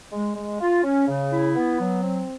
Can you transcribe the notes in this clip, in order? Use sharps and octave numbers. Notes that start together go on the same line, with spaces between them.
G#3
G#3
F4
C#4
C#3
E4
B3
F#3
C4